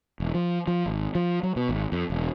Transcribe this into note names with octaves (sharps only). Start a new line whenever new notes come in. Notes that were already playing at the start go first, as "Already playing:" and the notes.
E1
F3
F3
G#1
F3
F#3
B2
G#1
F2
E1